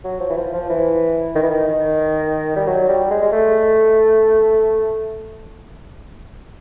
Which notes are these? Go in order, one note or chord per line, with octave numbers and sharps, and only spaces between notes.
F#3
F3
E3
F3
F3
E3
D#3
E3
D#3
G3
F#3
G3
G#3
G#3
A3